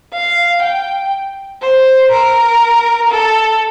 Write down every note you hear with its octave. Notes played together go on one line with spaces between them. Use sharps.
F5
G5
C5
A#4
A4